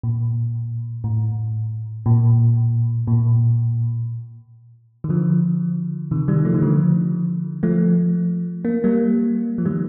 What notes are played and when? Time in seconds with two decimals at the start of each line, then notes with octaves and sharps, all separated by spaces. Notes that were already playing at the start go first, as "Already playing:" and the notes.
0.03 A#2
1.04 A2
2.06 A#2
3.07 A#2
5.04 D#3
5.09 D3 F3
6.11 C3 D#3
6.28 D#3 G3
6.45 F3 A3
6.54 D#3
6.62 D3 F3
7.63 F3 A3
8.65 A#3
8.84 G3 A#3
9.58 F3
9.65 D#3 G3